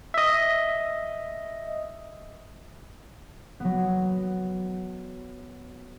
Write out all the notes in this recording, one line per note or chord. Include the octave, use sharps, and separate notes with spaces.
D#5 E5
F#3 B3